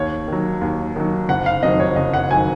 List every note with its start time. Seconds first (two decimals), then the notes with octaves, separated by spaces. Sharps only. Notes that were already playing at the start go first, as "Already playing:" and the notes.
Already playing: D#2 C#5
0.28 D#3 F#3
0.61 D#2
0.96 D#3 F#3
1.29 F#1 F#5
1.46 F5
1.62 F2 D#3 F#3 D#5
1.80 C#5
1.96 F#1 D#5
2.13 F#5
2.31 D#3 F#3 G#5